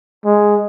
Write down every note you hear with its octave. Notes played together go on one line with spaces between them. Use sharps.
G#3